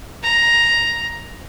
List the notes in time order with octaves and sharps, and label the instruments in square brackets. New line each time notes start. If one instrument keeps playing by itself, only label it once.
[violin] A#5